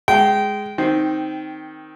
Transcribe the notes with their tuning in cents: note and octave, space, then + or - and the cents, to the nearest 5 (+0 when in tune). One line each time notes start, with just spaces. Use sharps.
G#3 +0 G5 -20
D#3 +0 C4 +0